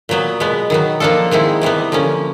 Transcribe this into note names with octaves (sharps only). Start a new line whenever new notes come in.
A#2 F#3 B3
B2 G#3 B3
D#3 F#3 B3
F3 A#3 D4 F4 A4
D#3 G#3 C4 E4
C3 E3 G3 B3
D3 F3 A#3 C#4